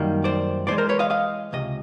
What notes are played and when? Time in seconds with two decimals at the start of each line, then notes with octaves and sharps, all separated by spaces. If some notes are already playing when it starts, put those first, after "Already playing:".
Already playing: F#2 D#3 G3 A#3
0.24 C5 D5
0.67 A2 E3 G#3 C5 D5
0.78 A#4 C5
0.89 B4 C#5
0.99 D#5 F5
1.10 D#5 F5
1.53 C#2 C3 D#5